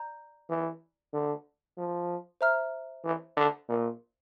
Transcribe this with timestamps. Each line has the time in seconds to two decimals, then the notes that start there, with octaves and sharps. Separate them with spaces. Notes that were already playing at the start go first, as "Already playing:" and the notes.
Already playing: D5 A#5 G6
0.50 E3
1.13 D3
1.78 F3
2.41 C5 E5 A#5 F6
3.04 E3
3.37 D3
3.69 A#2